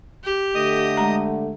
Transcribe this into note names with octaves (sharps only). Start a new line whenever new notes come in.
G4
D3 A3 D#5 D#6
G#3 A#5